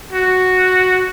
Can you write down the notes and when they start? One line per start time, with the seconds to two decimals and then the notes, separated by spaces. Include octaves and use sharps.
0.13 F#4